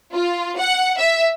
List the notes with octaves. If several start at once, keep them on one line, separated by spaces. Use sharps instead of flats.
F4
F#5
E5